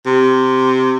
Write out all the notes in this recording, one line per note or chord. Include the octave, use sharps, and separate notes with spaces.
C3